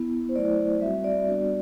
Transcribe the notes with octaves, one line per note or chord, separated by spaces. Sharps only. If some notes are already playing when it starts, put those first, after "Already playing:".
Already playing: B3 E4
C5
F#3 A3 E4 D5
G3 C4 F#4 E5
D5
G3 B3 D4 F#4